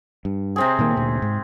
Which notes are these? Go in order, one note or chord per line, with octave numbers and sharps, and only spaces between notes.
G2
C3 C4 G#4
A#2 D#3 A#3
D2 A#2
G#2